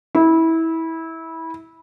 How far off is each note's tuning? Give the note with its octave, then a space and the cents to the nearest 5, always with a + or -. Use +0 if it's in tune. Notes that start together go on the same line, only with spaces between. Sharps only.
E4 -20